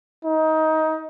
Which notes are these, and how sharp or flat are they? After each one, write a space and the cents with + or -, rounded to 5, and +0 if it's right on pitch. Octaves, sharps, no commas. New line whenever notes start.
D#4 +20